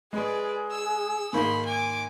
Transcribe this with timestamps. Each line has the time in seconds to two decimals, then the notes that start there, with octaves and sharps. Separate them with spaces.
0.13 G#3 G#4 B4 D5
0.71 E6
1.33 G#2 D#3 A#3 B5 C6
1.66 G#5 D6